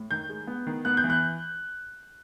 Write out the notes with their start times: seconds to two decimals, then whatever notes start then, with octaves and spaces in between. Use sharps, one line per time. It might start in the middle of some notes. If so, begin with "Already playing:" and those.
Already playing: A2
0.11 D#3 G6
0.29 G#3
0.47 B3
0.67 D#3
0.85 B3 F#6
0.97 G6
1.04 E3
1.10 F#6